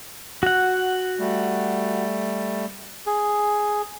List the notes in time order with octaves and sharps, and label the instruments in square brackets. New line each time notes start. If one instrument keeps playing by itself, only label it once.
[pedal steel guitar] F#4 F#5
[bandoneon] G3 A3
[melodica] G#4